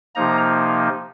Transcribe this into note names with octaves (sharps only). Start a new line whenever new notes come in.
C3 F3 A#3 D#4 A#5